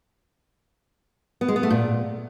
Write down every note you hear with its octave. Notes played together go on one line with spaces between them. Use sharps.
B3
G#3
B3
A3
A#2